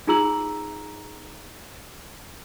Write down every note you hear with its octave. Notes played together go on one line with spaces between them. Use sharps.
D#4 F4 G#4 A#5 E6 F#7